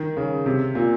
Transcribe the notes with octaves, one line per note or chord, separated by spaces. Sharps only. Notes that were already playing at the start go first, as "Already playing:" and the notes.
Already playing: D#3
C#3
C3
A#2